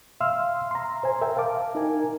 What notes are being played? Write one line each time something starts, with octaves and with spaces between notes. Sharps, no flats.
E5 F5 C6 E6 F6
A#5 C6
C5 G#5
A#4 E5 G5
F5 A5 D6
D#4 A#4 G#5